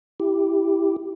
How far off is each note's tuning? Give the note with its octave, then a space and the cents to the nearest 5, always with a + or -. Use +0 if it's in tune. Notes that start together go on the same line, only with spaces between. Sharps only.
E4 +0 G4 +0